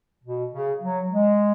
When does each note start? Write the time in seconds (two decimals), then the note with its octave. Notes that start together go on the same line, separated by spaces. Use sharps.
0.24 B2
0.52 C#3
0.81 F#3
1.10 G#3